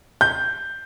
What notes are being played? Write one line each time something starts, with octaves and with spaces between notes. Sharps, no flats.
G6